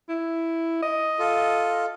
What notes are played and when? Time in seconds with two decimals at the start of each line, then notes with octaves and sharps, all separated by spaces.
0.09 E4
0.83 D#5
1.19 F4 A4